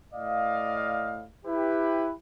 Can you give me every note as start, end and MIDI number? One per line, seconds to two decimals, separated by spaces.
0.13 1.24 45
0.13 1.24 74
0.13 1.24 75
0.13 1.24 77
1.46 2.11 64
1.46 2.11 67
1.46 2.11 71